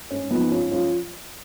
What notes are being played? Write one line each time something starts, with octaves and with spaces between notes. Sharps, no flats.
G#2 C#4
F3 B3 D#4
G#2 C#4 F4
F3 C#4 F4